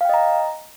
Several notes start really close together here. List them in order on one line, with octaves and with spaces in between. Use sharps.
F5 G5 D#5 A#5